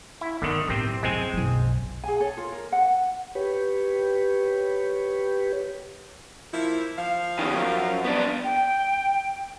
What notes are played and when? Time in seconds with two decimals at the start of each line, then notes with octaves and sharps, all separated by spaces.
0.21 E4
0.42 D3 D#3 B3
0.68 A2 C3 G3 C4
1.03 C2 F#2 G#3 C4 G#5
1.33 F#1 B1
2.04 G#4 G#5
2.20 A4 C#5
2.37 F4 A#4
2.52 A#4
2.72 F#5
3.35 G4 B4 C#5
6.53 F3 A#3 E4
6.98 F3 F5
7.39 E2 D#3
7.54 F#2
8.04 B3 D4
8.44 G5